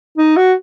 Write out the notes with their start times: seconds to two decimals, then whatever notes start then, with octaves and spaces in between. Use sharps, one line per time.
0.17 D#4
0.37 F#4